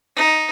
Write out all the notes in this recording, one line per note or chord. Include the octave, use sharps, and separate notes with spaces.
D#4